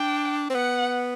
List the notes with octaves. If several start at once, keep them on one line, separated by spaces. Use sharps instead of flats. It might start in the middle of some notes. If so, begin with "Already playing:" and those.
Already playing: D4 G5
C4
B3 F#5